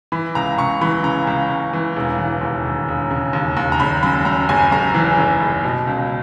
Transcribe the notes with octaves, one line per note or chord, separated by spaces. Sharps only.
E3 B5
C#2 A#5
C#2 C#6
E3 B5
C#3 A#5
C#2
C#2
E3
E1
E3
D#2
E1
E1
C#3
D#2
D#2
A#5
F#1 B5
F#2 B5
F#2 A#5
F#1 G#5
F#1 A#5
E3
F#1
F#1
B2
C#2